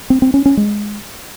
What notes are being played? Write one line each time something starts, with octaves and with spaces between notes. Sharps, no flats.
C4
C4
C#4
C#4
G#3